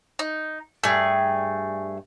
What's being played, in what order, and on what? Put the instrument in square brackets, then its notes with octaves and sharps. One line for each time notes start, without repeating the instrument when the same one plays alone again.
[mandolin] D#4
[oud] G2 G3 [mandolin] A3 G#4